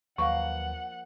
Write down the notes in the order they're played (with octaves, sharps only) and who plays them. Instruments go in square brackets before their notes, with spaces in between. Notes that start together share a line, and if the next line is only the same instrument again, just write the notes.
[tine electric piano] D#2 F#3 B4 [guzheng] F3 A#3 F5 [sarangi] F#5 [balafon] C#6